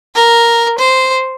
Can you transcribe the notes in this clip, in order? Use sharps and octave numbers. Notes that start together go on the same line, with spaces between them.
A#4
C5